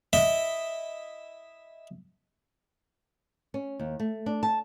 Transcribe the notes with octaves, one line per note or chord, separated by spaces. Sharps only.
E4 D#5 E5
C#4
D#2
A3
D4
A5